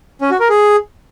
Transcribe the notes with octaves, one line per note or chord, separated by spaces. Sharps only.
C#4
F#4
A#4
G#4